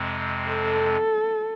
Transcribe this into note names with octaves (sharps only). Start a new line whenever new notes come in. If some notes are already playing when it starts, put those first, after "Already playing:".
Already playing: F2 C3 G#3 C4
A4